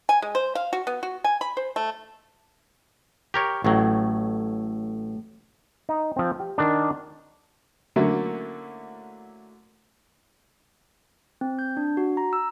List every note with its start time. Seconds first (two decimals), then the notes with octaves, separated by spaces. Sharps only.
0.09 G#5
0.22 G#3
0.35 C5
0.55 F5
0.73 F#4
0.87 B3
1.03 F#4
1.24 G#5
1.41 B5
1.57 C5
1.76 A3
3.34 G4 A#4 C#5
3.64 A1 A2 F#3
5.89 D#4
6.16 F3 C4
6.40 G4
6.58 D#3 D4
7.96 D3 F#3 A3 A#3 C#4 E4
11.41 C4
11.59 G6
11.77 D4
11.97 F#4
12.17 A#5
12.33 E6